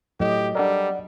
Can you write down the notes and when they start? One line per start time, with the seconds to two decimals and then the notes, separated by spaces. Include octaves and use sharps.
0.20 A2 F#3 G4 D#5
0.55 G3 D4 A4 A#4 D5 F#5